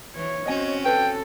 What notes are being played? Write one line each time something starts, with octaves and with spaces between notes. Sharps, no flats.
E3 C#5
C4 C#4 F#4 D#5 G#5
A4 B4 G5